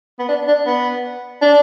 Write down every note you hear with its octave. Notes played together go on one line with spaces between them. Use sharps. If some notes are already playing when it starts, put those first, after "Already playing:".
B3
D4
D4
B3
D4